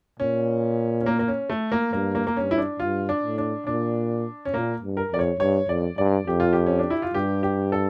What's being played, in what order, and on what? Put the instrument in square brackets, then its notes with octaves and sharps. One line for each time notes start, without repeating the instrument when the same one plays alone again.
[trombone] A#2 [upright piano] C#4
[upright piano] C#4
A#3
A#3
C#4
A3
A#3
[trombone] G2 [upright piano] A#3
[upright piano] A#3
A#3
[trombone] G2 [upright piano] C#4
[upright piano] E4
D4
[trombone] G2 [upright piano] F4
[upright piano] D4
[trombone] A2
[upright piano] D4
[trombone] A#2 [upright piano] D4
[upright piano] C#4
[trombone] A#2 [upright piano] A#3
[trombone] G2
[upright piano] A#4
[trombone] F2 [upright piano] D5
[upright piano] C#5
[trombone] G2 [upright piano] C#5
[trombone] F2 [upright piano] D5
[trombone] G2 [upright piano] D5
[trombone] F2 [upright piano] G4
[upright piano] F4
G4
C#4
D4
E4
F4
[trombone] G2 [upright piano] G4
[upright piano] G4
A4